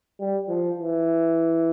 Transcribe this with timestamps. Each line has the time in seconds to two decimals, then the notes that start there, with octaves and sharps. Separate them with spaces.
0.19 G3
0.48 F3
0.79 E3